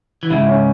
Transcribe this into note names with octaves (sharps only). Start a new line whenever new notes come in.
E3
G#2 C#3 E4
C#4